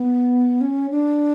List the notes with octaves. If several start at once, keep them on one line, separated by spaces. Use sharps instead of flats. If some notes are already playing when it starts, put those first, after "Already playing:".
Already playing: B3
C#4
D4